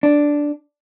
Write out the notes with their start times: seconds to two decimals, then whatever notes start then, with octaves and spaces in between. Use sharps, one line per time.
0.03 D4